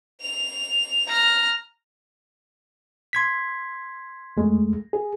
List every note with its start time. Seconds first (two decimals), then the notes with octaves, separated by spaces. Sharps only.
0.21 F7
1.08 A#5 F6
3.13 C6 G#6 B6
4.37 F2 G#3 A3
4.93 G#4